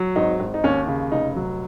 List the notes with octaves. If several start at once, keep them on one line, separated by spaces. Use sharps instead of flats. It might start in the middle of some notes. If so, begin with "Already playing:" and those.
Already playing: F#3
G#1 D#4
G#1
D#4
D#2 C#4
C#3
F1 D#4
F#3